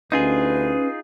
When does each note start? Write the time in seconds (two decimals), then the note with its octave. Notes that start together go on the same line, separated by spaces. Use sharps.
0.12 D2 C#4 D#4 F4 G#4 B4